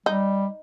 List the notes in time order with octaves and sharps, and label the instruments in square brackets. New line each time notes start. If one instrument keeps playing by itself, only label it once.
[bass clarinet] G3 [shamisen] D#4